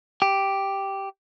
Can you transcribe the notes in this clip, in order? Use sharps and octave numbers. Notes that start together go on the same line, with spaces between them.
G4